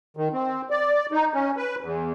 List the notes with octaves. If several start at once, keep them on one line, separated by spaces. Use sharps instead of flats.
D#3
C4
D5
D#4
C#4
B4
E2